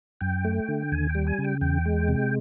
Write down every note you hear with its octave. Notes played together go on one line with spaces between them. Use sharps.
F#2 G5
A3
D3
D#2 G#5
G5
G3
G#5
C#3
G5
E2 G5
G#3
C3